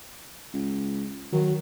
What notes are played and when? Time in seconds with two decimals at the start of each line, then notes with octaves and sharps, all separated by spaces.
0.54 C#2
1.32 D#3 F#3